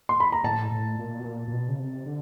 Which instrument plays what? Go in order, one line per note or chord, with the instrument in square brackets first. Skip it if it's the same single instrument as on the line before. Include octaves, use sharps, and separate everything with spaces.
[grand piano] C6
B5
A#5
[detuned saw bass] A2 [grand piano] A5
[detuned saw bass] A2
A#2
B2
A#2
A#2
B2
C#3
C3
D3